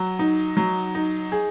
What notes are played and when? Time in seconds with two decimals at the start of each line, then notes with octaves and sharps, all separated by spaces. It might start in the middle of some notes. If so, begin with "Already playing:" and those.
Already playing: F#3
0.19 D#4
0.57 F#3
0.95 D#4
1.32 G#4